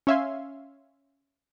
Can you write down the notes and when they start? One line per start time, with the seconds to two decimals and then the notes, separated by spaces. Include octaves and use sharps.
0.07 C#4 C#5 E5 F5 G#5 C6